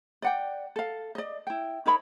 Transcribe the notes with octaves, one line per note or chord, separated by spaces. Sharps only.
D5 F#5 G5
A4 F5
D5 D#5
E4 G5
D#4 A#4 C#5 B5